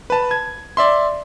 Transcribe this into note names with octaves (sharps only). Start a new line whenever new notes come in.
B4 A5
G#6
D5 E5 C6